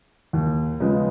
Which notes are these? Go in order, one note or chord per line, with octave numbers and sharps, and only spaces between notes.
D#2
C#3 F3 G#3 B3